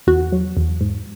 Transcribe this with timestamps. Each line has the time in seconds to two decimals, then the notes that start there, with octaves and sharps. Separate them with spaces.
0.07 E2 F#4
0.32 F#3
0.57 E2
0.81 G#2